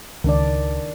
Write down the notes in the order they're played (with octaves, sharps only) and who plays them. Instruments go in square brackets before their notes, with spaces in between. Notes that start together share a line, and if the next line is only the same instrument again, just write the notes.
[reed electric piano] C#2 [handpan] D#3 D4 D5